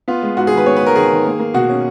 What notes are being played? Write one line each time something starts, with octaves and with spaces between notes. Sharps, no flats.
B3 F4
G#3
G#2 F#4
G#4
D#3
B4
B3 C#5
B4
G#3 A#4
D#3 G#4
D#3
A#3
A#3
B2 F#4
C#4